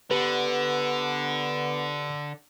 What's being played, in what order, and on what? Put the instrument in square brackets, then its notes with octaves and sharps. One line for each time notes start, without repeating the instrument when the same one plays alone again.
[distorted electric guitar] D3 [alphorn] B3 [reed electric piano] G4 B4